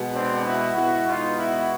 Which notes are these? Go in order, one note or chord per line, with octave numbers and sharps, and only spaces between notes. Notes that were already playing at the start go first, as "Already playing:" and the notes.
Already playing: B2 G#3 B3
C4 D4
E4 F#4
B2 G#3 B3 E4 F#4
D#4 F4
E4 F#4